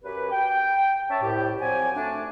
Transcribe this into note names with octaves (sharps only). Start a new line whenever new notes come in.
F#2 C#4 G4 B4
G5
C#4 C#5 E5 A5
C2 A2 G4
F3 F#3 C4 D5 G#5
A3 D4